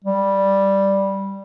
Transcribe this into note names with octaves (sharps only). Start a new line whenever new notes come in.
G3